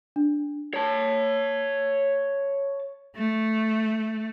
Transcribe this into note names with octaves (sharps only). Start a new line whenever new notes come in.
D4
C#5 A5
A3